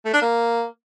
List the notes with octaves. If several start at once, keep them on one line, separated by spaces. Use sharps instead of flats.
A3
D4
A#3